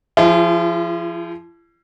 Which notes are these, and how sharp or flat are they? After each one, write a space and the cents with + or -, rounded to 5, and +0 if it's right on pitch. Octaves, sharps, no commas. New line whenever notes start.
F3 -15 E4 +45 G#4 -10